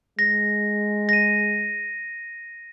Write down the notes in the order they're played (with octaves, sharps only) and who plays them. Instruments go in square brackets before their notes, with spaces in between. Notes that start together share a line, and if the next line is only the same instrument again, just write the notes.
[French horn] G#3 [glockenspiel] A#6
[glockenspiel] A#6 D#7